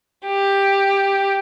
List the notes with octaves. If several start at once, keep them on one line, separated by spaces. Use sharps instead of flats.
G4